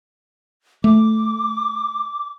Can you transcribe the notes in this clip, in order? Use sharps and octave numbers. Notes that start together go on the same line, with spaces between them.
A3 D6